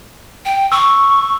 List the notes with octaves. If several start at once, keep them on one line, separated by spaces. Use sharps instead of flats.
G5
C#6 E6